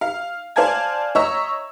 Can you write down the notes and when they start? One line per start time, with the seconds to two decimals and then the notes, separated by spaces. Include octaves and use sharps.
0.01 F5
0.56 C5 D5 F5 G#5 A5 G#6
1.15 C#5 D#5 E5 A#5 C#6 E6